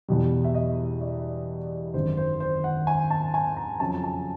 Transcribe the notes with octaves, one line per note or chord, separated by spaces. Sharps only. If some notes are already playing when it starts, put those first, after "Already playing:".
E2 B2 G3
E5
D#5
D5
G#1 F#2 D#3 C5
C5
C5
F#5
G#5
A5
G#5
A#5
F2 C#3 F#3 A5
A5